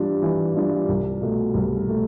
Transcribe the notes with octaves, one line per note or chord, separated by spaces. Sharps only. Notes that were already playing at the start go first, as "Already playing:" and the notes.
Already playing: E3 G3 D4 F4
E3
G3 D4 F4
C2
B2 A3
C2
B2 A3